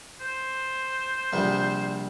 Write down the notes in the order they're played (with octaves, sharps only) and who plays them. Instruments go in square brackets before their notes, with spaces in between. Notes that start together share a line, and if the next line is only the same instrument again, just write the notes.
[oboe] C5
[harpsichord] A#1 C3 G3